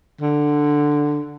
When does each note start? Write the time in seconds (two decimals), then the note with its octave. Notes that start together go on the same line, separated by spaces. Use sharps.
0.21 D3